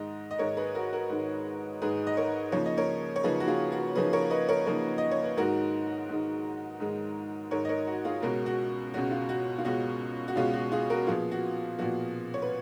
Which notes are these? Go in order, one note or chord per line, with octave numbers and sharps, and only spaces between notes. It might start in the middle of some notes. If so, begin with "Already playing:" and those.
Already playing: G#2 D#3 G#3 D#5
D#5
G#2 D#3 G#3 A#4 C#5
G#4 B4
F#4 A#4
F#4 A#4
G#2 D#3 G#3
G#2 D#3 G#3 G#4 B4
D#5
A#4 C#5
C#3 F3 A#3 D#4 C#5
D#5
A#4 C#5
C#5
C#3 F3 A#3 D#4 G#4 B4
F#4
F4 G#4
F#4
C#3 F3 A#3 D#4 G#4 B4
A#4 C#5
B4 D#5
A#4 C#5
C#3 F3 A#3 D#4 A#4 C#5
D#5
C#5
B4
G#2 D#3 G#3 D#4 F#4 A#4
G#2 D#3 G#3 D#4
G#2 D#3 G#3 D#4
G#2 D#3 G#3 D#4 A#4 C#5
D#5
A#4 C#5
F#4
F4 G#4
C#2 B2 G#3 C#4 F#4 A#4
F#4
C#2 B2 G#3 C#4 F#4
F4
F#4
F4
C#2 B2 G#3 C#4 F#4
F#4
C#2 B2 G#3 C#4 F4
F#4
F4 G#4
F#4 A#4
A#2 F3 B3 F4 G#4
F#4
A#2 F3 B3 F#4
C#5
B4